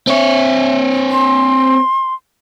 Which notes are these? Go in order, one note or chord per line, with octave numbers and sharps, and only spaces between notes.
C4 C#5 E5
C6